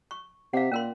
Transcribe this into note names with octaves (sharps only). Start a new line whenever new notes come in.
C#6
C3 F5 F#5
A#2 C#4 A#4 C6